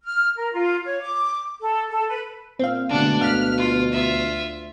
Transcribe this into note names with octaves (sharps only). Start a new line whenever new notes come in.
F6
A#4
F4
C#5
D6
A4
A4
B4
A#2 C4 F5
B2 D3 G#3 A3 D4 F#5
D2 F5 F6 F#6 B6
F4
F4 E5